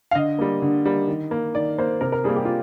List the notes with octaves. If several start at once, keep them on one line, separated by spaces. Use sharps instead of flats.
F5
D3 D#5
G3 A#3
D3
G3 A#3
D#3
A#3
D#3 D5
A#3 C5
C3 A#4
A#4
G3 A#3 G#4
G4
F4